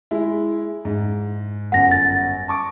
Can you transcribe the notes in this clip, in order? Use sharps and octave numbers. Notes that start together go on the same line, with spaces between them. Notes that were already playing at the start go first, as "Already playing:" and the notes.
G#3 E4
G#2
G1 F#2 F#5 A#6
A6
A5 C#6 D6